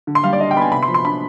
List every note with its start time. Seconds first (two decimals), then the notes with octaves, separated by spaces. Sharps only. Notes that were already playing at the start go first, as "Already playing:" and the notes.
0.07 D3
0.15 C6
0.24 G3 F5
0.33 D5
0.40 D4 D#5
0.51 G5
0.56 B3 B5
0.61 G#5
0.72 C3 B5
0.83 C6
0.88 F3
0.94 C6
1.05 D4 B5